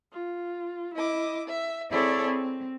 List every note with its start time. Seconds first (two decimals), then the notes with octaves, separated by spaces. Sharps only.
0.12 F4
0.93 E4 D#5 D6
1.47 E5
1.90 C4 E4 G#4 A4 C#5 D5
2.22 C4